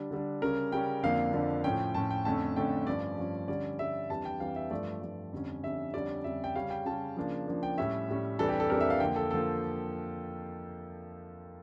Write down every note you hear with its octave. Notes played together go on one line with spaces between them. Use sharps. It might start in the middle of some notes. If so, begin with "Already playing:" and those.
Already playing: D3 G3 D4
D3 G3 D4
C#3 G3 C#4 A#4
C#3 G3 C#4 G5
F2 D3 F3 A#3 D4 F5
F2 D3 F3 A#3 D4
A2 F3 C#4 G5
A2 F3 C#4 A5
G5
F2 D3 A3 C#4 A5
F2 D3 A3 C#4 G5
G2 F3 C#4 D5
G2 F3 C#4
D3 G3 C#4 D5
D3 G3 C#4 E5
F2 E3 G3 D4 A5
G5
F2 E3 G3 D4 F5
E5
G2 F3 A3 D5
G2 F3 A3
F2 D3 G3 C#4
F2 D3 G3 C#4 E5
F2 D3 G3 C#4 D5
F2 D3 G3 C#4 E5
G5
C#3 G3 C#4 F5
G5
C#3 G3 C#4 A5
C#3 F3 A#3 D4
C#3 F3 A#3 D4
G5
A2 G3 C#4 E5
A2 G3 C#4
F2 E3 G3 D4 A4
G4
A4
F2 E3 G3 D4 A#4
E5
F5
F2 D3 F3 A#3 G5
A4
D3 F3 A#3 A4